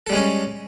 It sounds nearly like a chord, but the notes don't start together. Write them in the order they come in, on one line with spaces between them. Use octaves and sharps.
A4 G3 G#3 C#4